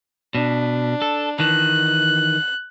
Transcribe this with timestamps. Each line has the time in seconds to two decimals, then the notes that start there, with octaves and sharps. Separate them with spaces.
0.35 B2 D4
1.02 A4
1.40 D#3 E3 F#6